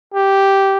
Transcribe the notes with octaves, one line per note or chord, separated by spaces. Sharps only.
G4